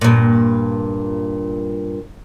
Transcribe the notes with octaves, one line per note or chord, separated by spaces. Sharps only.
G2 A#2